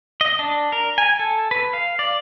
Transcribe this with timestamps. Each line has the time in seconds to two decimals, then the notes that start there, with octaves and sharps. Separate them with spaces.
0.21 D#5
0.39 D4
0.72 A#4
0.98 G#5
1.19 A4
1.51 B4
1.73 F5
1.99 D5